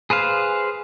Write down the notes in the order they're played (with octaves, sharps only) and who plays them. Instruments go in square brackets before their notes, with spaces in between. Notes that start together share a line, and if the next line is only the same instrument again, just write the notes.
[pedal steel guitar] G#4 B4 C5 F5